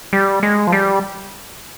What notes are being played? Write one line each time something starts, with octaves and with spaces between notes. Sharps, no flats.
G3
G#3
F3
G3